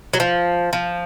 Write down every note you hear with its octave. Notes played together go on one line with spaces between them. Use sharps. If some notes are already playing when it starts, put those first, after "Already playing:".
F#3
F3
F3